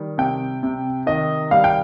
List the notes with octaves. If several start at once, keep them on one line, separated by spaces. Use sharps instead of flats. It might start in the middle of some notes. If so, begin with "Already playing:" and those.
Already playing: D#3 G3
C3 G5
C3
D#3 D#5
G3 F5
G5